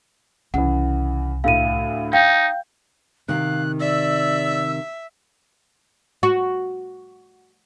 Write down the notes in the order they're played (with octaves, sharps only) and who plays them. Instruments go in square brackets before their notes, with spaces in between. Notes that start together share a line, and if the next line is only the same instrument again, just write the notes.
[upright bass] C2 [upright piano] C#3 E3 [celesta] F#5
[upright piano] D2 A2 [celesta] F5 D#7
[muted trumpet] D#4 [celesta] F5 G5 [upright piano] G6
[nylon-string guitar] C3 D#3 [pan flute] F5 [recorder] F#6
[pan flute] D5 [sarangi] E5 [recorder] E6
[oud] F#4